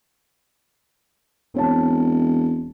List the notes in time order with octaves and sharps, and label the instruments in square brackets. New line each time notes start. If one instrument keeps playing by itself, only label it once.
[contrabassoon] E1 [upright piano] C4 C#5 A5